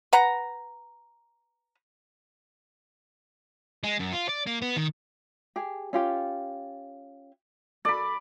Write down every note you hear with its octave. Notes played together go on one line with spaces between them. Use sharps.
B4 F#5 A#5
G#3
F#2
F4
D5
A#3
B3
D#3
G4 G#4
C#4 F4 G4
A4 D5 B5